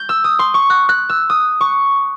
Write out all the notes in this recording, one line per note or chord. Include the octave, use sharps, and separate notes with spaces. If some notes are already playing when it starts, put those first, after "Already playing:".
Already playing: G6
E6
D#6
C6
C#6
F#6
F#6
E6
D#6
C#6